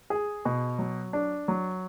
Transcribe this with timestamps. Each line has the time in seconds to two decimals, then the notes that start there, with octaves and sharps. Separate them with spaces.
0.10 G#4
0.45 B2
0.79 F#3
1.13 D4
1.48 F#3